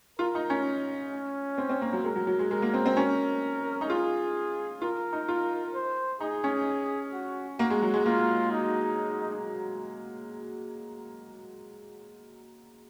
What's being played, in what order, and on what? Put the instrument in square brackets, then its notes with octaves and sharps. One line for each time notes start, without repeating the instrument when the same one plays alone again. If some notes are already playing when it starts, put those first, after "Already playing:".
[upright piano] F4 [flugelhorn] A#4
[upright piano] D#4
C#4
[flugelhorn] C#4
[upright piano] C4
C4
A#3
F#3
[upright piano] G#3 [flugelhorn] A#4
[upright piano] F#3
F#3
G#3
[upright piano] G#3 [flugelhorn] A#4
[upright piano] A#3
C4
C4
[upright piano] C#4 [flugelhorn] A#4
[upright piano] D#4
[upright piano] F4 [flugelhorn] G#4
[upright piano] F4 [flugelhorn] A#4
[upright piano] D#4
F4
[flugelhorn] C5
[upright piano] D#4 [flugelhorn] G#4
[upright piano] C#4
[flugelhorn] F#4
[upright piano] A#3 [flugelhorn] F#4
[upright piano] G#3
F#3
G#3
[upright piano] A#3 [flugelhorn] F4
[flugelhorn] D#4